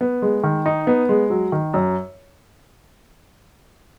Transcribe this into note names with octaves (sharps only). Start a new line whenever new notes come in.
B3
G#3
D#3
D#4
B3
G#3
F#3
D#3
F#2